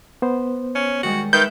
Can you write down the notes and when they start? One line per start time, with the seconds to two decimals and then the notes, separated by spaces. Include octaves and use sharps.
0.22 B3 C5
0.75 C#4
1.03 D#3 G3 G#3 F#4
1.33 D#3 B4 E5 D#6 F#6 G6